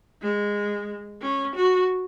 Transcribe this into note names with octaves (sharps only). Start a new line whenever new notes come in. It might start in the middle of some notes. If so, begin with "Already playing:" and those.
G#3
C#4
F#4